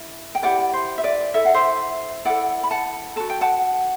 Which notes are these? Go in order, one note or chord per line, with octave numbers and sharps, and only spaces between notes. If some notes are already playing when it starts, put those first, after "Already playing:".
Already playing: E4
G5
E4 G4 B4 D5 F#5
C5
E5
B4 D5
E4 A4 E5
F#5
C5 E5
E4 A4 D5 F#5
B5
F#5 A5
F#4 A4 A5
G5
F#5 A5